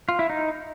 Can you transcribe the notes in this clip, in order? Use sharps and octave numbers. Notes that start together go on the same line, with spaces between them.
F4
E4
D#4